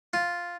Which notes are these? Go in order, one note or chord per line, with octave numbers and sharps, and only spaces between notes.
F4